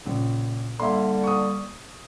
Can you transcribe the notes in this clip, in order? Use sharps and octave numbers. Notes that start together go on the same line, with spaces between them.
A#1 C#3
D3 G3 A#3 E5 C6
C#6 D#6